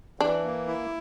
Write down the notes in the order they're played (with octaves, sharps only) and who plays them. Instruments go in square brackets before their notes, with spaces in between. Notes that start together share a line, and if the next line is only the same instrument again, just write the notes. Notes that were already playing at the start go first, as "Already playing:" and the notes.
[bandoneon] E3 [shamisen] D4
[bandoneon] A#3
E4